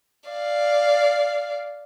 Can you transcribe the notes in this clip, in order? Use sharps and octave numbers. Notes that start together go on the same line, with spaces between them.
D5 F5